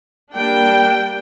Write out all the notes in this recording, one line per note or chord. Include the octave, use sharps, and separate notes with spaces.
G3 A#3 D4 G5